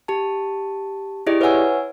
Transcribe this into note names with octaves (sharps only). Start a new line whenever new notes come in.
G4 A5
E4 G4 G#4 D5 D#5
B4 C#5 E5 F#5 G#5 E6